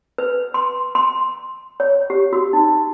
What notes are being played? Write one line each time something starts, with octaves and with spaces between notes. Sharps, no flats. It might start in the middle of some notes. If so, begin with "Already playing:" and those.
B4
C6
C6
C#5
G4
F#4
D#4